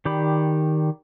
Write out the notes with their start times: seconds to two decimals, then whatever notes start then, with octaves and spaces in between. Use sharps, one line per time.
0.05 D#3 G4 D5 B5